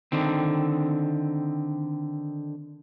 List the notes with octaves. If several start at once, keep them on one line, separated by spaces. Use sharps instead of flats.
D3 D#3 C4